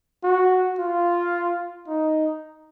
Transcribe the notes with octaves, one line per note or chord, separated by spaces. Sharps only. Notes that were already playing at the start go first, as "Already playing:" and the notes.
F#4
F4
D#4